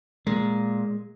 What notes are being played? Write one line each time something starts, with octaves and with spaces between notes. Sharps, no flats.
A#2 G#3